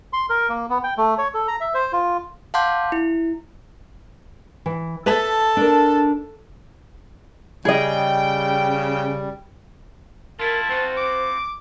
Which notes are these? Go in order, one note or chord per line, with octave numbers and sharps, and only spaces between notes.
C6
A#4
A#3
B3
G5
A3
C#5
A4
A#5
E5
C5
F4
F5 F#5 A5 C6 D6 G6
E4
E3
A4 B4 E5 A5
D4 A#4
C#3 G3 G#4 D#5 G5
E4 F4 A#4 A5
C4 F4 F#4 C5
D6